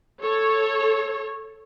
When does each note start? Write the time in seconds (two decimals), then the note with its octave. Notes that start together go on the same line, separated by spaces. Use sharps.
0.21 A4 C#5